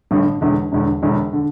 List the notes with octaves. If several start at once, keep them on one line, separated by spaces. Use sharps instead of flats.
A1 G2 D3
E1 E2 D3
E1 E2 D3
E1 E2 D3
D3